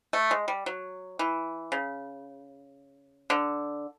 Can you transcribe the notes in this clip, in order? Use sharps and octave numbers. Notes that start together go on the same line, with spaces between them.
A3
G#3
G3
F#3
E3
C#3
D3